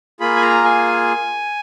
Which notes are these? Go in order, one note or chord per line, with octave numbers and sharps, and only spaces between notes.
A#3 F4 G#4 B5
G#5
A#5
G#5